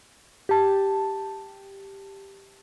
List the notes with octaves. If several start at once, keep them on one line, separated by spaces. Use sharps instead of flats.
G4 A5